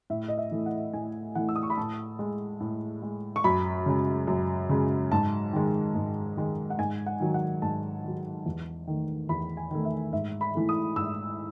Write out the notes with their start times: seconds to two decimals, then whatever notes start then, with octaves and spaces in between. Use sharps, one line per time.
0.10 A2 E5
0.28 D#5
0.38 E5
0.51 E3 A3
0.66 F#5
0.93 A2 G#5
1.35 E3 A3 F#5
1.49 E6
1.56 D#6
1.63 C#6
1.70 B5
1.77 A2 A5
2.19 G#3
2.60 A2
3.02 G#3
3.36 C#6
3.44 F#2 B5
3.86 C#3 G#3
4.27 F#2
4.69 C#3 G#3
5.12 G#2 A5
5.53 D#3 G#3
5.95 G#2
6.37 D#3 G#3
6.70 F#5
6.78 G#2 G#5
7.06 F#5
7.20 D#3 F#3
7.34 F#5
7.62 G#2 A5
8.04 D#3 F#3
8.46 E2
8.87 D#3 A3
9.29 E2 B5
9.57 G#5
9.71 D#3 A3
9.85 E5
10.13 G#2 E5
10.41 B5
10.55 E3 A3
10.69 D#6
10.96 G#2 E6